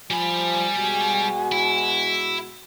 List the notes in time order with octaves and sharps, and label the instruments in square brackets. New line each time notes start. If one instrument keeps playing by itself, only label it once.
[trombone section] F3 [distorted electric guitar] G3 B5 [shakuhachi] G#5
[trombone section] B2 G#3 F#4
[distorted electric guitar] E4